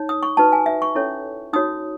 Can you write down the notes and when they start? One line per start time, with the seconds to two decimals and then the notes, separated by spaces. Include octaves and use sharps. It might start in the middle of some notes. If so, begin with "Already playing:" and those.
Already playing: D#4 C#5
0.09 D#6
0.23 C#6
0.37 D#4 F#4 B4 A5
0.52 G#5
0.66 E5
0.82 C#6
0.95 C#4 E4 A4 C#5
1.53 D#4 F#4 C#5 D#6